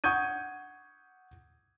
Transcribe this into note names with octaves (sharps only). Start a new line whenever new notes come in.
F#5 C#6 D#6 G6 G#6 D#7